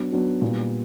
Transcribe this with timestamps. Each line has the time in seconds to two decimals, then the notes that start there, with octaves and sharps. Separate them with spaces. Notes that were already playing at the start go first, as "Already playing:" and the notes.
Already playing: F#3 B3 D4 F#4
0.12 F#3 B3 D4 F#4
0.41 A#2 G3 B3